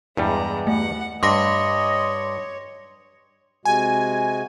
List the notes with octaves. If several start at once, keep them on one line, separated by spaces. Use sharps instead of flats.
E2 G2 G3 G#3 A#5
A3 F#5
G2 C#5 D#5 C6 D6 A#6
C3 G#3 F#4 G#5